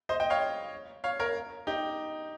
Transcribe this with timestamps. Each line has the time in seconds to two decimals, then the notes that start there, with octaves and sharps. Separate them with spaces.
0.09 C5 D#5
0.20 D#5 G5
0.30 C#5 F5
1.04 C#5 F5
1.20 A#4 C#5
1.67 D#4 G4